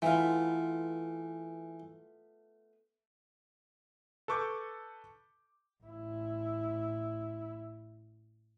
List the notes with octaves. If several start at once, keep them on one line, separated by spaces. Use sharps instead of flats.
E3 A3 B3 F4
A4 B4 C#6 D6 G6
A1 E4